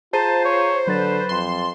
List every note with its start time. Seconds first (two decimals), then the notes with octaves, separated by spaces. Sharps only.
0.13 F4 G#4 C5 A5 A#5 D#7
0.45 C#5
0.87 D3 F#3 B4 A6 E7
1.29 F2 C6